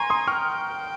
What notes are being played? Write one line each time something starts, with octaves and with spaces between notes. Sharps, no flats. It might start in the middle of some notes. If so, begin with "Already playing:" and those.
Already playing: G#5 A#5 C6 C#6
C6 D#6
G5 C#6 F6